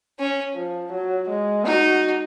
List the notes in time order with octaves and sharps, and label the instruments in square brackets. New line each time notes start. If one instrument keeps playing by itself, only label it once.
[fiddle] C#4
[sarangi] F3
F#3
G#3
[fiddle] D#4 [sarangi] F#4